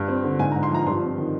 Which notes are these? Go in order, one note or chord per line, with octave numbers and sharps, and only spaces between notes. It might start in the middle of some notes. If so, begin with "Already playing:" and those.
Already playing: G2
C4
D3
G#2 G#5
A#5
G#2
C6
F3 A#5
G2 C6
C4
D#3